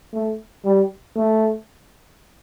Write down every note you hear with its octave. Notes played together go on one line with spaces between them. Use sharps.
A3
G3
A3